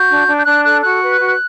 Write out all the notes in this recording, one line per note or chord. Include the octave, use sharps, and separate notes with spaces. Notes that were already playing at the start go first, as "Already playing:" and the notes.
Already playing: F#4 G6
D4
D4
G6
D4 F#6
A4 F#6
F#4 F#6
B4
F#4